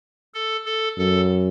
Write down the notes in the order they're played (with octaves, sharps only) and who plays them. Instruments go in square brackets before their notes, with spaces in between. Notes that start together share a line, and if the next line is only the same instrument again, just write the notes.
[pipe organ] A4
A4
[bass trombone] F#2 [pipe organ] A4